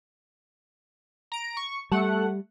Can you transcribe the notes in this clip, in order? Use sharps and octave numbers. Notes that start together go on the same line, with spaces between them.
A#5 D7
C#6
G3 A3 F#5